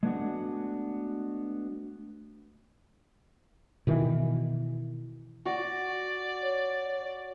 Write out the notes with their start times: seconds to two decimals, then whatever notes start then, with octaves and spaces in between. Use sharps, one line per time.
0.03 G#3 A3 B3 D4 F#4
3.87 B2 D#3 E3
5.46 F#4 D5
6.42 C#5